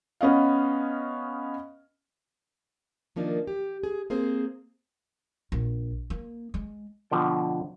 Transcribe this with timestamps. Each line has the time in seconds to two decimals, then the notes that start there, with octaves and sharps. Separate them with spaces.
0.21 B3 C#4 D#5 F5
3.16 D#3 F3 A#3 D4 D#4
3.47 G4
3.83 G#4
4.10 A#3 C4 G#4 C5
5.52 A#1
6.10 A#3
6.54 G#3
7.10 B2 D3 F3 G5 A5